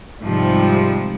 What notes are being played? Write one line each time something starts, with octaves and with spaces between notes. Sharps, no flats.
G#2 C3 F3 G3